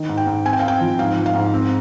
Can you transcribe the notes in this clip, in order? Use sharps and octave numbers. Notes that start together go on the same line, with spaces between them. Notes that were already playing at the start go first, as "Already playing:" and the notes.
Already playing: D#3
G#2
G5
G#2
C4 G#5
G5
F5
C4
G5
F3
G#2 F5
F3
F5
G#2
C4